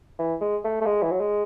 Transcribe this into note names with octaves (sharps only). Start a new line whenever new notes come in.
E3
G#3
A3
A3
G#3
E3
F#3
G#3